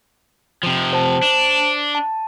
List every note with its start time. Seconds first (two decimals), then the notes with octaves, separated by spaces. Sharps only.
0.63 C3 F3
0.93 C5 A5
1.23 D4
1.95 A5